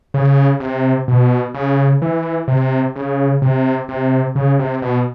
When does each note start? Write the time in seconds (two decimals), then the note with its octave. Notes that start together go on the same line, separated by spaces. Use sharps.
0.14 C#3
0.60 C3
1.08 B2
1.54 C#3
2.02 E3
2.48 C3
2.96 C#3
3.42 C3
3.89 C3
4.35 C#3
4.59 C3
4.82 B2